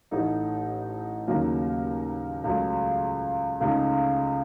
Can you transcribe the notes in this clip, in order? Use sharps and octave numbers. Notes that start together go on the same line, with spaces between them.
A1 A2 A3 D#4
D#2 C#3 F#3 A#3
C#2 C#3 F#3 A3
C#2 C#3 A3 D#4